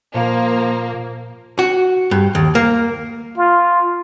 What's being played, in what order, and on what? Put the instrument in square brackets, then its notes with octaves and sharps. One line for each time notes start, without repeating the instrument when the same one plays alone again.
[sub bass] A#2 [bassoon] F3 [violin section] A#3
[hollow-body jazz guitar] F#4
G2
D#2
A#3
[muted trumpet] F4